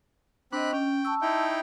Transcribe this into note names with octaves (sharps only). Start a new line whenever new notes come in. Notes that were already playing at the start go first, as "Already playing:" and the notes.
C4 D4 D#5 B5 F#6
C#4 G5
A5 C#6 E6
D#4 E4 G5